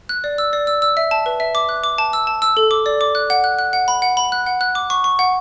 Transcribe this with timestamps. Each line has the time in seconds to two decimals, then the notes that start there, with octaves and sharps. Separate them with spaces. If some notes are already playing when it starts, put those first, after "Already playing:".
0.09 F#6
0.24 D5
0.38 E6
0.53 D5
0.67 E6
0.82 E6
0.97 E5
1.11 A5
1.26 B4
1.40 E5
1.55 D6
1.69 F#6
1.84 D6
1.98 A5
2.13 E6
2.27 A5
2.42 E6
2.57 A4
2.71 D6
2.86 D5
3.01 D6
3.15 F#6
3.30 F#5
3.44 F#6
3.59 F#6
3.73 F#5
3.88 B5
4.02 F#5
4.17 B5
4.32 F#6
4.46 F#5
4.61 F#6
4.75 D6
4.90 C#6
5.04 C#6
5.19 F#5